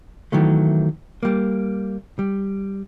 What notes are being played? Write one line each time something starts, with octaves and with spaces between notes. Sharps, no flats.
D#3 E3 F#3 A3
G3 A#3
G3